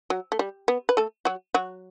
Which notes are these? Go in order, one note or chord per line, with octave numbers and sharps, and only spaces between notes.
F#3
A3
G3
B3
B4
A3 A4
F#3 F#4
F#3 F#4